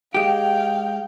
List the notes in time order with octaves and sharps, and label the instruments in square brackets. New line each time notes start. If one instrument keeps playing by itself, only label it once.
[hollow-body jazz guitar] G#3 G4 [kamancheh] F5 G5